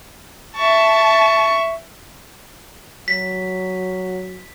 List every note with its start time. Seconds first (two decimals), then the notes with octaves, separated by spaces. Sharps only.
0.57 E5 A5 C#6
3.08 F#3 B6